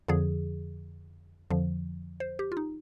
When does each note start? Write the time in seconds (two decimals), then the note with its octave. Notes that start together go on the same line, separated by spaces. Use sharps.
0.08 F2 D3 F3 G#4
1.50 F2 D3 F3
2.20 C5
2.39 G4
2.52 F4
2.57 D#4